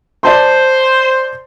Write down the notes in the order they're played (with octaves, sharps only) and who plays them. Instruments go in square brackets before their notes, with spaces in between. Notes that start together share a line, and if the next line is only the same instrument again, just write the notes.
[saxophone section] C5 [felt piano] D5 A5 C6